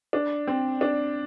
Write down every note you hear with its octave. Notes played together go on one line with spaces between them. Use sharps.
D4
C4
D4